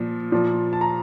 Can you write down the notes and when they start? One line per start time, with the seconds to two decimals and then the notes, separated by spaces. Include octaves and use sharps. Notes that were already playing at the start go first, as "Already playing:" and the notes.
Already playing: A#2 F3
0.32 A#2 F3
0.73 A5
0.81 A#5